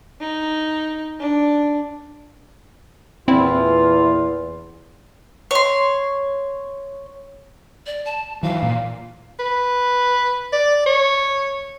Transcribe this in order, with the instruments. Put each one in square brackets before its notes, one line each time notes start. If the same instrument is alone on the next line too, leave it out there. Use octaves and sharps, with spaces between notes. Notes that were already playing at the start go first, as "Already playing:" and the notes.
[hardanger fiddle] D#4
D4
[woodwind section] E2 [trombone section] A#2 E3 [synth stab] C4 E4 [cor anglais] F4
[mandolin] C#5 C6
[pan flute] D5
A5
[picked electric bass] E3 F#3 [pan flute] F5
[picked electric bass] A#2
[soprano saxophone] B4
D5
C#5